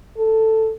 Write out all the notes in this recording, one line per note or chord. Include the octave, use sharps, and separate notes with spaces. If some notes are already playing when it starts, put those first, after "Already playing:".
A4